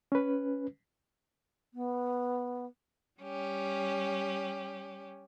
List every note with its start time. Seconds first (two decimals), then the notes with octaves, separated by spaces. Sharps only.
0.12 C#4 B4
1.74 B3
3.20 G3 C#4 G4